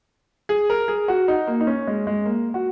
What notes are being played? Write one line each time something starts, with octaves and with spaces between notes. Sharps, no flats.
G#4
A#4
G#4
F#4
D#4
A#3
D#4
C#4
G#3
G#3
A#3
F#4